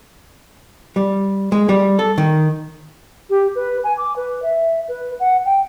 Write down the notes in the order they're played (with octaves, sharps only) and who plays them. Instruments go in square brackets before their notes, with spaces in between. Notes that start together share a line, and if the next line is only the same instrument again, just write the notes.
[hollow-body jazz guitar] G3
G#3
G3
A4
D#3
[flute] G4
B4
G#5
D6
B4
E5
B4
F#5
G5